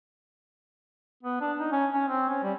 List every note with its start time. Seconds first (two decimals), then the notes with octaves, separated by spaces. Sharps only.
1.23 B3
1.41 D4
1.59 D#4
1.72 C#4
1.93 C#4
2.08 C4
2.29 C#4
2.43 G3